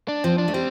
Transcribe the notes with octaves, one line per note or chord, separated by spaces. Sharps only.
D4
F3 C4
D4
A3
G3 C4